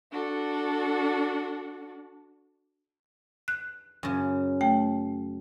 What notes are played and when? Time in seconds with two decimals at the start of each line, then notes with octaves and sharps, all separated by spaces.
0.12 D4 F#4 A4
3.48 F#6
4.03 F#2 C#3
4.61 A3 G5